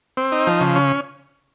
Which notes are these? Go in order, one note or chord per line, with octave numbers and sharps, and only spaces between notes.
C4
D#4
F3
C#3
C#4